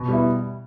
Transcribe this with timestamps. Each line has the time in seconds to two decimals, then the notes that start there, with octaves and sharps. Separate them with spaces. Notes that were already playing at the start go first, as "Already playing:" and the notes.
Already playing: B2
0.08 G3 B3 E4